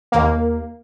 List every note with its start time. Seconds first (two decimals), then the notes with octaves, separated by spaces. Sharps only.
0.12 D#2 A#3